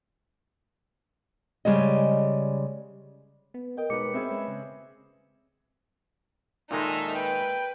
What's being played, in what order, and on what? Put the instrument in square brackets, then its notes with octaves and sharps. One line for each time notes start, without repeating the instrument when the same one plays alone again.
[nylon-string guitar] C#3 G3 G#3 D#5
[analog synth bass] B3
[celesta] A#4 D#5 [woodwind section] G5
[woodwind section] D#2 [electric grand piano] B2 D#4 B4 [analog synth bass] G#3 [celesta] D6 C#7
[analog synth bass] B2 [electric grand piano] C4 C#4 G#4 [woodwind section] B4 E5
[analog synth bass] G#3
C#3
[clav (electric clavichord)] A#2 D#3 G#3 [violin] D#4 E5 [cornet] A4
[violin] B4 [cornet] G5